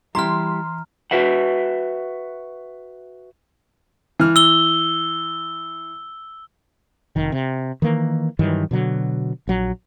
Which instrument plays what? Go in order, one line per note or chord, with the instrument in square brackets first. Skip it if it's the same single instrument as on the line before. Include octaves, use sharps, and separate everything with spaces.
[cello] E3 [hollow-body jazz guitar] G3 E4 G4 [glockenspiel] A#5 F6 [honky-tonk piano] C6
[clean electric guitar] F#4 B4 E5 F#5
[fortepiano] E3 F6
[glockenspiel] E6 G7
[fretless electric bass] F1 D#3
C3
D#3 E3 A#3
G2 D#3 E3 F#3
B2 D3 F#3
A#1 F#3